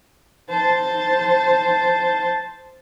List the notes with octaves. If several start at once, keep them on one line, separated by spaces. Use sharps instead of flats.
C5 A5